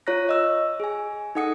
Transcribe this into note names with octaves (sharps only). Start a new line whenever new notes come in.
F4 C#5 A#5 F#6 A#6
C#5 D#5 E6
G#4 G#5
D#4 A4 F#5 D#6 C#7